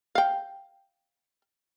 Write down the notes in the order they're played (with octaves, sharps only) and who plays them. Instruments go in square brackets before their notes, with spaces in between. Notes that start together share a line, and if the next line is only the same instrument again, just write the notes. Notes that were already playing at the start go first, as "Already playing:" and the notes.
[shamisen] F5 G5